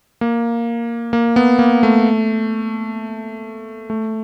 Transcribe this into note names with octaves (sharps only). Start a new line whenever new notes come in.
A#3
A#3
B3
A#3
A3
A3